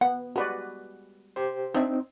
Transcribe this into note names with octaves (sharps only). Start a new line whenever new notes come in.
B3 F#5
G3 G#3 F#4 B4 D5
G4 C5
C4 D4 D#4 D5 E5